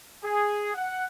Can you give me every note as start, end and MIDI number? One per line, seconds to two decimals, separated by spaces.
0.24 0.72 68
0.75 1.06 78